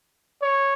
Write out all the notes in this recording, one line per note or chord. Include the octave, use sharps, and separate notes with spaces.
C#5